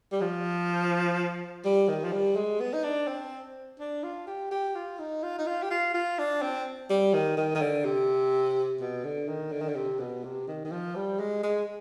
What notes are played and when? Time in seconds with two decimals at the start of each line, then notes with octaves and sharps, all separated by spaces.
0.12 G3
0.21 F3
1.65 G3
1.88 D#3
2.04 F3
2.13 G3
2.36 G#3
2.61 B3
2.74 D#4
2.84 D4
3.08 C4
3.80 D4
4.03 F4
4.27 G4
4.51 G4
4.75 F4
4.99 D#4
5.23 F4
5.39 D#4
5.47 F4
5.62 G4
5.71 F4
5.94 F4
6.19 D4
6.42 C4
6.90 G3
7.14 D#3
7.37 D#3
7.55 D#3
7.61 D3
7.85 C3
8.81 B2
9.04 D3
9.28 D#3
9.52 D3
9.61 D#3
9.69 D3
9.76 C3
10.00 B2
10.24 C3
10.48 D#3
10.65 D#3
10.72 F3
10.96 G3
11.19 G#3
11.43 G#3